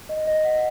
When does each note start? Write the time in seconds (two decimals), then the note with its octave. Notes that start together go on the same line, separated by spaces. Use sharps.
0.09 D#5
0.27 D#5
0.44 F#5